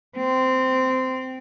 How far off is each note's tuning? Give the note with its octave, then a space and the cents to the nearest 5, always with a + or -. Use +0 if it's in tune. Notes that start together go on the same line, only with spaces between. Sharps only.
C4 -15